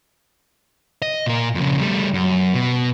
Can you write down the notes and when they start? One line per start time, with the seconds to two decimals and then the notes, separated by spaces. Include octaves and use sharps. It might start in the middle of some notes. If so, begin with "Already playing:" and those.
1.02 D#5
1.26 A#2 A#4
1.55 F2 C#3
1.80 G3 A3
2.14 F#2
2.54 B2